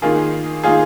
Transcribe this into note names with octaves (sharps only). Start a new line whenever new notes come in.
D#3 A#3 F4 G#4
D#3 A#3 F4 G#4